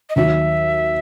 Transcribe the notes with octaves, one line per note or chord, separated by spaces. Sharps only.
D#5
D#2 D#3 F#3 E5